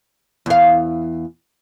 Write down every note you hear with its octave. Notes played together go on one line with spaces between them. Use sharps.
E2 F5